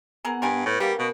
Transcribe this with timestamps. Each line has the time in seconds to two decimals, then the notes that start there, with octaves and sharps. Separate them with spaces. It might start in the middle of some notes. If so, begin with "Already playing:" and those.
0.25 E3 B3 G#4 A#4 F#5 A#5
0.42 G2 A#4 G#5
0.66 A2 B4
0.80 C#3 G3 A#3 B3 A#4
0.99 B2